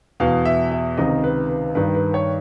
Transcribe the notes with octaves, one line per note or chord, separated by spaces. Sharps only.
E2 B2 F5
E5
E5
C#2 C3 D#3 D#5
B4
B4
G2 D#3 B4
B4
C#5